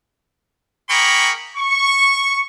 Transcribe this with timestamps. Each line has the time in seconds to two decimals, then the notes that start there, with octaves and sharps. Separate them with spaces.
0.89 A#3 G#4 G5 A#5 B5 C#6
1.57 C#6